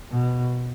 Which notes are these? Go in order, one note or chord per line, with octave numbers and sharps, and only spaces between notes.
B2